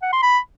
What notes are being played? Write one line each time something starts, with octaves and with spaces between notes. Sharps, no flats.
F#5
C6
B5